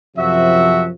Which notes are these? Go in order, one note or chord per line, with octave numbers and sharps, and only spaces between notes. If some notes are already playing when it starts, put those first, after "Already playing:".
F#2 C3 F3 F#4 E5